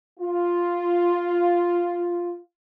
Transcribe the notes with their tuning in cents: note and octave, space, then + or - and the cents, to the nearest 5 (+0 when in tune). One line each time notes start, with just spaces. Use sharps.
F4 +0